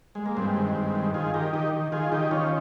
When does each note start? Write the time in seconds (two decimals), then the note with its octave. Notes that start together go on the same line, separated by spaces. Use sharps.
0.15 G#3
0.26 A#3
0.37 G2 G#3 C4
0.57 D#3
0.76 G2
0.95 D#3
1.14 D#3 F4 G#4
1.34 D#3 G4 A#4
1.53 D#3 D#4 G4
1.73 D#3
1.92 D#3 F4 G#4
2.12 D#3 D#4 G4
2.31 D#3 C#4 F4